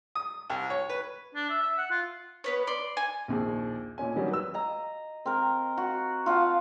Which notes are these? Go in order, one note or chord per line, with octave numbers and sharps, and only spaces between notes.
D#6
C2
C#5
B4
D4
E5
E5
F#5
F4
B3 B4 C#5
D5 C6
G#5
A#1 D#2 G#4
B1 A#2 C#4 G#5
D#3 F#3 G3 C#4
B4 E6
D#5 A#5
C4 A#4
F#4
F4 F5 F#5 A5